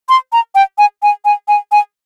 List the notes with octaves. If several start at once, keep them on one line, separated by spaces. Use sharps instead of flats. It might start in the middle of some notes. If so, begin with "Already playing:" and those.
C6
A#5
G5
G#5
G#5
G#5
G#5
G#5